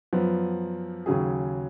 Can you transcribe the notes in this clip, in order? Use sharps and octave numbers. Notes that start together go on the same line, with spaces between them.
F#2 F3 B3
D#2 C#3 F#3 C#4 G#4